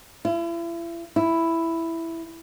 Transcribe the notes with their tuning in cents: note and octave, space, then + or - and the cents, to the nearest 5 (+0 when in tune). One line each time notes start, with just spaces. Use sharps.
E4 +40
E4 +5